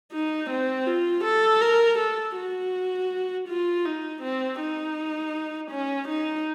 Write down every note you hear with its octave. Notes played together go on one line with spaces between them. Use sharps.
D#4
C4
F4
A4
A#4
A4
F#4
F4
D#4
C4
D#4
C#4
D#4